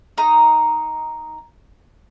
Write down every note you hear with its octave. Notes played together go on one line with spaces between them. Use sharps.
D#4 A#5